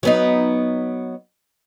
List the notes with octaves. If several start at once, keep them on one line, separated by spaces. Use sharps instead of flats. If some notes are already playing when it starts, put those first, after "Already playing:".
F#3 B3 D#4